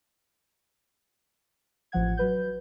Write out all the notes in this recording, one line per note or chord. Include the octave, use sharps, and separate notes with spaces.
A1 F3 F#5 G#6
F#3 B4 G6